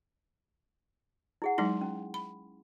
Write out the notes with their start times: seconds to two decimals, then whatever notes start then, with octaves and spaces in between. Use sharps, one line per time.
1.42 E4 G#4 F#5
1.58 F#3 G#3 D#4 E4 G#5 C6
1.81 C#4
2.14 B5